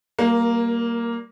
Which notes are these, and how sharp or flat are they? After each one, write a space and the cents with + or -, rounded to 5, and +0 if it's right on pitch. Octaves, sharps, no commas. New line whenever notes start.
G3 -15 A#3 +0 A#4 +30